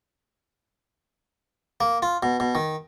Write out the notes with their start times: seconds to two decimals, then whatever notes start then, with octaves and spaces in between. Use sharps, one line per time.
1.81 A#3
2.02 F4
2.23 B2
2.40 B2
2.55 D#3